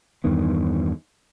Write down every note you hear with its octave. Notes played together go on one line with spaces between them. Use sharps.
E2 G2 D#3 B3